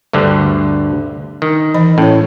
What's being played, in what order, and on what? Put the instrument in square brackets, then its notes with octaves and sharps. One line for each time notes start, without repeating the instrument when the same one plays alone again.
[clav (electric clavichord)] D2 G2 D3
D#3
[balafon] E3 D#5
[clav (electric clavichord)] A2 [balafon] C#4 C#5